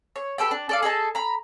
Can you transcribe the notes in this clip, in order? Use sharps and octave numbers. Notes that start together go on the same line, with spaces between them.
C#5
G4 A4 B4 G5
D4
A4 D5 F5
G#4 A4 D#5 A5
A#5 B5